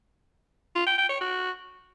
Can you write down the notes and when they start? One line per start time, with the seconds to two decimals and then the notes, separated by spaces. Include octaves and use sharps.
0.75 F4
0.87 G5
0.98 G5
1.09 C#5
1.21 F#4